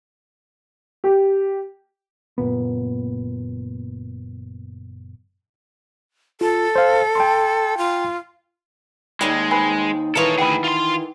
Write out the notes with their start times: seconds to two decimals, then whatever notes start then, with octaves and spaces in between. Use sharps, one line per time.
1.04 G4
2.38 F#1 D#2 A#2 B3
6.41 F4 A4
6.76 C5 F5
7.15 G5 A5 C6
7.78 F4
9.21 D#2 D#3 G3 G#3
9.51 C4 B4 G#5
10.15 D#3 E3 F4 A4 A#4 C#5
10.38 D2 G#4 F#5 G5 B5
10.64 F4 C6